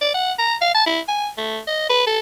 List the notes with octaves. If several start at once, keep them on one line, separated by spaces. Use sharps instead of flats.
D5
F#5
A#5
F5
A5
E4
G#5
A3
D#5
B4
A4